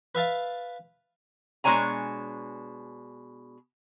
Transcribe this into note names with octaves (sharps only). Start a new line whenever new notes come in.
B4 E5 F5 A5
B2 G#3 D4 C#5 G#5 A#5